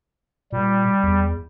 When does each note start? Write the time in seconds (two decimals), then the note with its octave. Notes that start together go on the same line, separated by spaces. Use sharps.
0.52 A#2 G3
1.03 E2